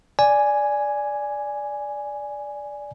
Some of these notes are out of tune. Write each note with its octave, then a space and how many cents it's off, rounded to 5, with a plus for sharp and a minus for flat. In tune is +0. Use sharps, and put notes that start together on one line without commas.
D5 -5 G#5 +0